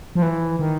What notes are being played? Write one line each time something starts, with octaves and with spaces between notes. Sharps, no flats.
F3
E3
D#3